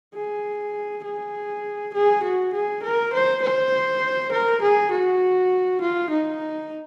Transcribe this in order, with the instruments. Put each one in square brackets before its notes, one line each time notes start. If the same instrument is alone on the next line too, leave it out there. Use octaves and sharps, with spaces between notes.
[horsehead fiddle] G#4
G#4
G#4
F#4
G#4
A#4
C5
C5
A#4
G#4
F#4
F4
D#4